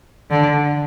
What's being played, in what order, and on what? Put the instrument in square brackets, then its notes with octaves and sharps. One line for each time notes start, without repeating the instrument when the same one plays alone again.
[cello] D3